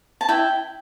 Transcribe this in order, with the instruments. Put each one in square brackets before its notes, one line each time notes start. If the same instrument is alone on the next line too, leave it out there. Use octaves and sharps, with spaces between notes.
[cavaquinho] A5
E4 G5